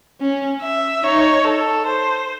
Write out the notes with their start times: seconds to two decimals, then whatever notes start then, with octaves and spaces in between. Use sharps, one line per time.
0.21 C#4
0.62 E5
1.03 D#4 C#5
1.45 A4
1.86 C5